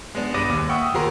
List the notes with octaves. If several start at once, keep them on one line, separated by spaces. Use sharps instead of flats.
G#3 B3 D4
G2 G3 B4 D6 A#6 D#7
D#2
E5 F#5 G5 C#6 D#6 E6
D#2 G4 G#4 A#4 A#5 C6